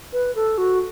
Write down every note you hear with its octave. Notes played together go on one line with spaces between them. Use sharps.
B4
A4
F#4